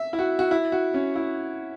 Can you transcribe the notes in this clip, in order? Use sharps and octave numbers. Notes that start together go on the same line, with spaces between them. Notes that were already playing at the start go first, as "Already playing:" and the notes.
Already playing: E5
E4
F#4
F#4
E4
F#4
C#4
E4